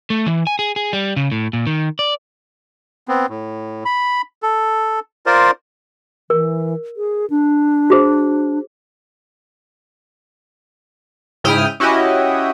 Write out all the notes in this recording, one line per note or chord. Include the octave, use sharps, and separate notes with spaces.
A3
E3
G#5
G#4
G#4
G3
C#3
A2
A#2
D#3
D5
B3 C4
A2
B5
A4
F4 A#4 C5 D5
E3 A#4
G#4
D4
F#4 G#4 C5
G#2 C#3 E4 G5 D#6 F6
C#4 E4 F#4 G4 D#5